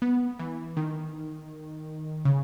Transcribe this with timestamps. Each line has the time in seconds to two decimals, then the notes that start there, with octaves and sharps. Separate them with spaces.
0.02 B3
0.39 E3
0.77 D#3
2.25 C#3